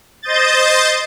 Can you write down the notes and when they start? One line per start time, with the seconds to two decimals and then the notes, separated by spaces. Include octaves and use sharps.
0.22 C5 D#5 G6 A6